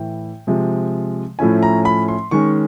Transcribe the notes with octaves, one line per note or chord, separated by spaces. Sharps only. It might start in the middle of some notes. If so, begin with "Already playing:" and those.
Already playing: A2 E3 A3 G5
C3 F3 G#3
A2 F3 A3 C#4 E4 G#5
A#5
B5
C6
D#3 G#3 C#4 C#6